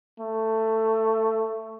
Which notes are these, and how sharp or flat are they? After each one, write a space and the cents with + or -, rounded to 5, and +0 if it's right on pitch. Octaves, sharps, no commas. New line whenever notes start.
A3 +15